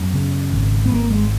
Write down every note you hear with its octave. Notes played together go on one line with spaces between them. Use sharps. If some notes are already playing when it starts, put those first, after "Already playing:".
Already playing: F#2 B3
C#3
G#1
B3
G#1 A#3
G#3